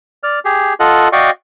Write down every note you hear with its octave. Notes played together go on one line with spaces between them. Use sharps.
D5 F6
G4 G#4
F4 A4 D#5 F#5
F#4 D5 D#5 F5 G5 C#6